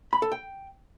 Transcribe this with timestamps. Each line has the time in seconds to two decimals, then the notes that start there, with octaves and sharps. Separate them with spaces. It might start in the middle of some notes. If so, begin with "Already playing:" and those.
0.13 B5
0.22 A4
0.32 G5